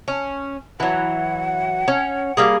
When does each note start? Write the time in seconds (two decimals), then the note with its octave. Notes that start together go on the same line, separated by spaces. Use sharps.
0.08 C#4
0.80 E3 F#3 F#5
1.88 C#4
2.37 G3 A#3 G#4